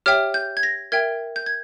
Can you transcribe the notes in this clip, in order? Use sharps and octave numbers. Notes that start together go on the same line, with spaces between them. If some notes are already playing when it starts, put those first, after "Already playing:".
G4 C#5 E5 G5 F6
G6
G#6
A#6
A#4 E5 G5 G#6
G6
G#6